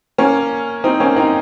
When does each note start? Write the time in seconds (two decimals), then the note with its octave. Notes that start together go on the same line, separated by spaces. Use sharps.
0.18 A#3 C#4
0.84 C4 D#4
1.00 A#3 C#4
1.16 C4 D#4